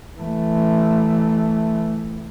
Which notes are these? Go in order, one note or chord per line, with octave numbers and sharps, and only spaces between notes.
E3 A3